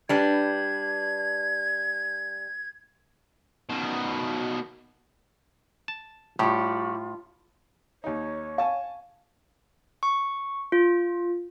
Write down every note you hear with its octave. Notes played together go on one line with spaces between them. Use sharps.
G3 D4 B4 G#6
B2 D#3
A5
A2 G3 F4 F#4
D#2 D#4 C#5
F5 G#5 A5 C#6
C#6
F4